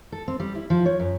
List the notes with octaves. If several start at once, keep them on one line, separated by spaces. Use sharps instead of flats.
A4
C4
G3
E4
F3
C#5
F#2